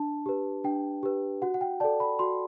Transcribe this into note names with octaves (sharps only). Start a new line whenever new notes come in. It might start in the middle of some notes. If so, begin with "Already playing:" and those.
Already playing: D4 A5
G4 B4
D4 G5
G4 B4
F#4 F#5
F#5
G5
A4 D5 A5
B5
F#4 C6